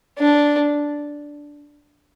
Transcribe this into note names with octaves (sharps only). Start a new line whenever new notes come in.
D4